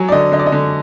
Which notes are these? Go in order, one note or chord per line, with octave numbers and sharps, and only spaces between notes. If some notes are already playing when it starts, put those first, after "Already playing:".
Already playing: F#3 G#5
D5
D3 D#5
D3 D#5
D5
D#5
D3